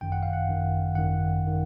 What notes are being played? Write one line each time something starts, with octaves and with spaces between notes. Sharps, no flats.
G#1 F#2 D#3 G5
F#5
F5
F#5
G#1 F#2 D#3
G#1 F#2 D#3 F#5
D#3